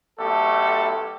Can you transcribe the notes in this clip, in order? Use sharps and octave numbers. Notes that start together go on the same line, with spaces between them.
B1 A3 G4 A4